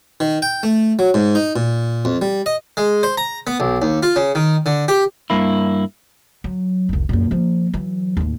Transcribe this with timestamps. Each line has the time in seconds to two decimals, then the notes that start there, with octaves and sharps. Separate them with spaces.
0.20 D#3
0.42 G5
0.63 A3
0.99 F#3
1.14 G#2
1.35 D#4
1.56 A#2
2.05 F2
2.22 G3
2.46 D#5
2.77 G#3
3.03 C5
3.17 A#5
3.47 B3
3.60 B1
3.82 D#2
4.03 F4
4.16 C#3
4.35 D#3
4.66 D3
4.88 G4
5.30 G2 A#3 E4
6.44 F#3
6.89 F1 C2
7.09 F#2 A#2
7.31 F3 A#3
7.74 E3 F#3
8.17 A1 D#2